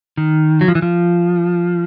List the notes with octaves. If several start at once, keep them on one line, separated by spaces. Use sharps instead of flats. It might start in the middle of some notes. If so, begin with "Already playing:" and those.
D#3
F#3
F3
E3
F3